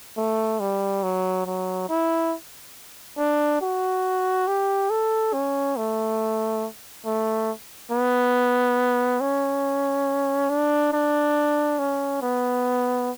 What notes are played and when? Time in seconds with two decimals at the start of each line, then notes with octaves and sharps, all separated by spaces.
0.17 A3
0.60 G3
1.03 F#3
1.46 F#3
1.89 E4
3.18 D4
3.62 F#4
4.47 G4
4.90 A4
5.33 C#4
5.77 A3
7.06 A3
7.91 B3
9.21 C#4
10.50 D4
10.93 D4
11.79 C#4
12.22 B3